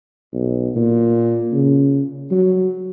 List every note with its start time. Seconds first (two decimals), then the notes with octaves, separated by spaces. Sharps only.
0.34 B1
0.75 A#2
1.53 C#3
2.31 F#3